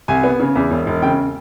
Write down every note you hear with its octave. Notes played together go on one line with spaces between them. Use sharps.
C2 G#5
B3
C#3
E2
E1
E1
C#3 G5